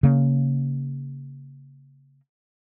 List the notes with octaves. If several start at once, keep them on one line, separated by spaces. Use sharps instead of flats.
C#3 A#3